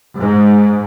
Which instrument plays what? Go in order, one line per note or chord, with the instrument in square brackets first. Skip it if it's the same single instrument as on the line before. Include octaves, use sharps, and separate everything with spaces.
[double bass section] G#2